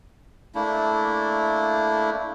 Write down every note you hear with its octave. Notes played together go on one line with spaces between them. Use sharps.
A3 A#3 D4 E4